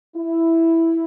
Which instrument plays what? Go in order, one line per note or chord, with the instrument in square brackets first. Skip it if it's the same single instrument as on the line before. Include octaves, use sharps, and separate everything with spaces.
[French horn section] E4